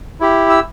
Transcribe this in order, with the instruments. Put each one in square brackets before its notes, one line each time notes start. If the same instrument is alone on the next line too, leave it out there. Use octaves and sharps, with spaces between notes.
[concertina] E4 G4
E6